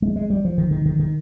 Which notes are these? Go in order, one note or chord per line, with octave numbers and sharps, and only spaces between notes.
G#3
G#3
G3
F3
D#3
D#3
D#3
D#3